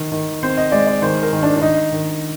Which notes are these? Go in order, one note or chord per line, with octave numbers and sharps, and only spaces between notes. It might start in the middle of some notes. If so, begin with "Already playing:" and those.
Already playing: D#3
D#3
C4 C5
D#5
G#3 D5
D5
D#3 C5
A#4
D#3
D4
D4
D#3 D#4
D#3